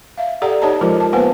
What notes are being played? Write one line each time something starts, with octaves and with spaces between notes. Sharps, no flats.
E5 F5
G4 A4 D5 F#5 A#5
D#4 G4 C#5 D#5 A5 A#5
F3 G#3 F4 A#4 C5
A5
A#3 B3 B4 C5 F#5 G#5